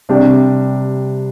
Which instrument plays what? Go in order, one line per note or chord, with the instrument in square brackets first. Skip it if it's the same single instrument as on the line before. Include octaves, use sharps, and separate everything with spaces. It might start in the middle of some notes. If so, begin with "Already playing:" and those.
[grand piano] C3 G3 D4 G4